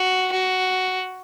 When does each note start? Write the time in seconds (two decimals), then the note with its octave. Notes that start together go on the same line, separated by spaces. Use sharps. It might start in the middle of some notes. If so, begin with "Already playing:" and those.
Already playing: F#4
0.32 F#4